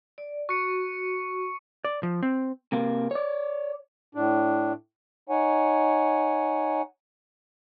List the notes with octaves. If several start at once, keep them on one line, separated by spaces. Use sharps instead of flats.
D5
F#4 C#6 C#7
D5
F3
C4
C3 A#3
C#5 D5
A2 D4
D#4 C#5 F#5 G#5